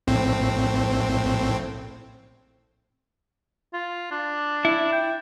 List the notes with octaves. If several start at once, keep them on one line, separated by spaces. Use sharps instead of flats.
A#1 A2 C4
F4
D4
E4
G5